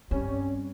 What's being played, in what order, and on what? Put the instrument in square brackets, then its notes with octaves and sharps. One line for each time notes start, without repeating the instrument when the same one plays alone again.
[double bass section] G2 G3 C#4 [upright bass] C4